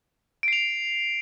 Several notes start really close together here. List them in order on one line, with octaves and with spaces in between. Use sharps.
D7 C7 F7